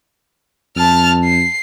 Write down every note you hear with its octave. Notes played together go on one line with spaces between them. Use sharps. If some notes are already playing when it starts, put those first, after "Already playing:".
F2 A5 F6
C7